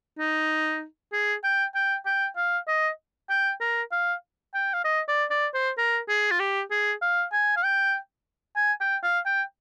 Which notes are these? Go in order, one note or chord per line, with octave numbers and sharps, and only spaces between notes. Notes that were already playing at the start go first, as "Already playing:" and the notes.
D#4
G#4
G5
G5
G5
F5
D#5
G5
A#4
F5
G5
F5
D#5
D5
D5
C5
A#4
G#4
F4
G4
G#4
F5
G#5
F5
G5
G#5
G5
F5
G5